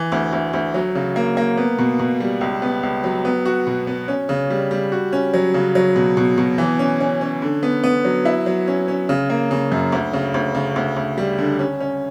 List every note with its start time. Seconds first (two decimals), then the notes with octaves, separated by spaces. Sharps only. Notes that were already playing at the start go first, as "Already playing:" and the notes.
Already playing: E3
0.12 D2
0.33 D2
0.53 D2
0.74 F#3
0.95 C#3
1.16 A#3
1.37 A#3
1.57 B3
1.79 B2
1.99 B2
2.20 G3
2.41 C#2
2.62 B3
2.83 C#2
3.04 F#3
3.25 B3
3.46 F#4
3.67 B2
3.87 B3
4.08 C#4
4.29 C#3
4.50 G3
4.71 G3
4.92 F#4
5.13 C#4
5.34 F#3
5.54 C#3
5.75 F#3
5.96 B2
6.17 B2
6.38 B2
6.58 E3
6.79 C#4
7.00 C#4
7.21 C#4
7.42 D3
7.63 B3
7.84 B3
8.05 F#3
8.25 E4
8.46 F#3
8.67 C#4
8.88 C#4
9.09 C#3
9.30 A#3
9.51 C#3
9.72 F#2
9.92 D2
10.13 C#3
10.34 D2
10.55 C#3
10.76 D2
10.96 D2
11.18 G3
11.38 D3
11.59 C#4
11.80 C#4